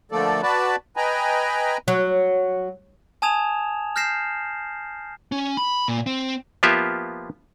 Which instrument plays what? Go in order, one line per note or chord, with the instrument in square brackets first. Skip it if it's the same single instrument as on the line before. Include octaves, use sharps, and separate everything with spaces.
[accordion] D3 F3 A3 A#3 A4 D5
F#4 B4 D5 A5 B5
B4 D#5 G5 G#5 A#5 B5
[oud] F#3
[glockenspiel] G#5 A5 D#6 G#6 E7 F7
F6 G6 A#6 C7 E7
[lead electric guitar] C#4
B5
A#2
C4
[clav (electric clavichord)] F3 A#3 B3 F4 G4 E5